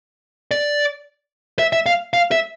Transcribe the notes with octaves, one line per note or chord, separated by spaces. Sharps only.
D5
E5
E5
F5
F5
E5